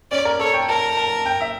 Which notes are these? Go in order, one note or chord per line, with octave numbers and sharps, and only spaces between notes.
C#4 D5
A#4
A4 C#5
G5
A#4 A5
A5
G5
E5